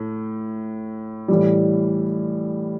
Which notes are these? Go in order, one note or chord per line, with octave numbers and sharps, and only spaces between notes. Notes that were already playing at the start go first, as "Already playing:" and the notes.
Already playing: A2 A3
A2 E3 G3